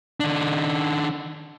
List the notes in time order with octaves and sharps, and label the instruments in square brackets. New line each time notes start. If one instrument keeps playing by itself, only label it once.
[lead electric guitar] D#3 D4